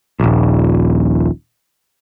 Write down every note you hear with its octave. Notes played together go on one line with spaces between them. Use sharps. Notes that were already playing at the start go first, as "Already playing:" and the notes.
D#1 A#1